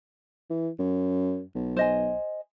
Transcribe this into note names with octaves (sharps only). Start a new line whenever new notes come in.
E3
F#2
B1
C5 D#5 G#5